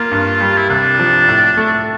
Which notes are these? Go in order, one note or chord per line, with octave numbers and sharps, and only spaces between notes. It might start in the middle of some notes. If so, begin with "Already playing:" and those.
Already playing: A#3 F4
G2
G3
E4
C2 D4
F3
A2
A3